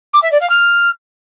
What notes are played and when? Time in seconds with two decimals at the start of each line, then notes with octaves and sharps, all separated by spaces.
0.13 D6
0.22 E5
0.32 D5
0.41 F5
0.50 F6